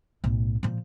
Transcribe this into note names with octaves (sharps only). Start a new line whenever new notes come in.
B1 A2
A#2 F3